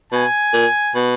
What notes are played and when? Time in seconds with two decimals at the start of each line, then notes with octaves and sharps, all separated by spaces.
0.12 B2 G#5
0.53 A#2
0.95 B2